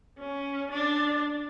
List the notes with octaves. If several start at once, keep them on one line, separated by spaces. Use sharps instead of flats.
C#4
D4